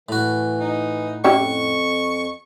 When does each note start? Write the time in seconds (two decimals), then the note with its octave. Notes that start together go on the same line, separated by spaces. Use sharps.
0.09 A2 E3 F#4
0.60 D#4
1.24 F2 C#4 E4 G4 C#6